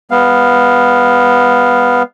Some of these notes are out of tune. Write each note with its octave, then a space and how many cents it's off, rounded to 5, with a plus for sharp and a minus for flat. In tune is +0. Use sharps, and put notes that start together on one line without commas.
G3 +45 B3 +0 F5 +0